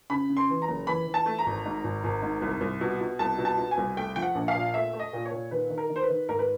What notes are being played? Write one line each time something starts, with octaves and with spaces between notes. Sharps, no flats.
C#3 B5
C#3
C6
E3
A#5
F#1
E3 B5
E3
A5
A3
A#5
G#1
G#2
G#1
G#1
G#2
C2
C2
B2
B2
C2 A5
B2
A5
B2
G#5
C2
A3 G5
F3 G5
F#5
A#1
F5
A#2
A3 E5
A3
D#5
A#2
C#5
A#2
D#3 B4
D#3
A#4
D#3
C5
B4
D#3
G#2 A#4
B4